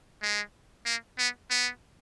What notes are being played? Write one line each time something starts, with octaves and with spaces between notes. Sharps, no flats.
G#3
A#3
B3
B3